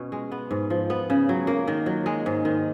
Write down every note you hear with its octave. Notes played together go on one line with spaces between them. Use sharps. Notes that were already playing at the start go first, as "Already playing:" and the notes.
Already playing: B2 C#4
G#3
B3
G#2
F3
B3
C#3
F#3
A#3
D#3
F#3
G#3
G#2
D#3